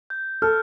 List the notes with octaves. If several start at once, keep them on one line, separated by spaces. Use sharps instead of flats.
G6
A4 F6